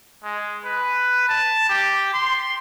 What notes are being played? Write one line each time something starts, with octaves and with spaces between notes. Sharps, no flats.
G#3
B4
A5
G4
C6